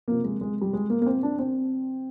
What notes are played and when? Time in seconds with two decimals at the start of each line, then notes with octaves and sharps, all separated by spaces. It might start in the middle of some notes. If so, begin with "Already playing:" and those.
0.08 C3 F3 A#3
0.24 G#3
0.41 G#3
0.61 G3
0.73 G#3
0.90 A#3
1.02 A#3
1.06 C4
1.23 D4
1.39 C4